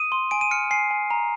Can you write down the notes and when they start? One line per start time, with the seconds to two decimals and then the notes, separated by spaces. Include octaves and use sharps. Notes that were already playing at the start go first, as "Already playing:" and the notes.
Already playing: D#6 D#7
0.12 C6
0.31 G#5 D7
0.41 D#7
0.51 F6 C#7
0.71 G#5 C7
0.91 G#5
1.11 A#5